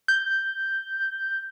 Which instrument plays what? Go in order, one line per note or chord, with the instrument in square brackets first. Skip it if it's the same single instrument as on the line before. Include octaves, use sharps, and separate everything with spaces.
[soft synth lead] G6